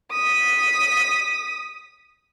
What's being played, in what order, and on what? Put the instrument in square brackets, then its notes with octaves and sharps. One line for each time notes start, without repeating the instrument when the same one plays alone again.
[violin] D#6 B6